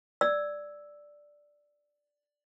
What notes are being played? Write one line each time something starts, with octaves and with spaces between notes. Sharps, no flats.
D5 E6